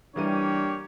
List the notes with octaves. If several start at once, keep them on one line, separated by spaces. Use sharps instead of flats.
E3 G3 A#3 D4 G4 C#5 D#7